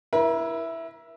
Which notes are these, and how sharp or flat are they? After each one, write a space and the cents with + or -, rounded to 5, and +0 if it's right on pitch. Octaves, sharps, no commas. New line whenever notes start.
E4 +0 A#4 +40